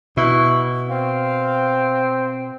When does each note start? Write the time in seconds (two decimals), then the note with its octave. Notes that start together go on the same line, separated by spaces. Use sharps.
0.17 B2 E4 C#6
0.89 C4 F5